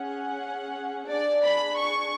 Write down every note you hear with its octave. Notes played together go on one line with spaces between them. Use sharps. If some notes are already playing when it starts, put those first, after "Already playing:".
Already playing: C#4 G#4 F#5
D4 G#4 D5
B5
C#6